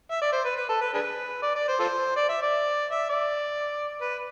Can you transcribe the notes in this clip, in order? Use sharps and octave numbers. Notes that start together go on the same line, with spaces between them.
E5
D5
C5
B4
B4
A4
B4
D4 G#4 B4
D5
D5
C5
F4 A4 C5
D5
E5
D5
E5
D5
B4